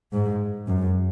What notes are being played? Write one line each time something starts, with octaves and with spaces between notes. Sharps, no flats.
G#2
F#2